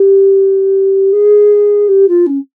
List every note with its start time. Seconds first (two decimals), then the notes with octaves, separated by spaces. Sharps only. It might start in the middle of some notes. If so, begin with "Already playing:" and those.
Already playing: G4
1.12 G#4
1.88 G4
2.08 F4
2.26 C#4